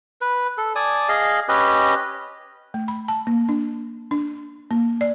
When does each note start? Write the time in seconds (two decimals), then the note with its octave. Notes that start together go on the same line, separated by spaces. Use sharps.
0.21 B4
0.58 A4
0.75 D5 G#5 A5 D#6
1.09 G#4 D#5 F5
1.48 C#4 G4 B4 D#5
2.74 A3
2.88 B5
3.08 A5
3.27 A#3
3.49 D4
4.11 D4
4.71 A#3
5.01 D5